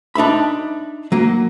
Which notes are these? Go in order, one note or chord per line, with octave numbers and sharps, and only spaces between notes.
D4 D#4 E5 B5
F#3 A#3